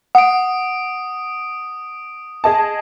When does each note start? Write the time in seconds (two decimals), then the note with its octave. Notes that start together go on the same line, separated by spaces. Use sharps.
0.15 F#5 D#6 D7
2.44 G#4 D#5 A5